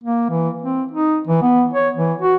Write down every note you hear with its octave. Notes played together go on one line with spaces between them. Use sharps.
A#3
E3
C4
D#4
E3
B3
C#5
E3
F#4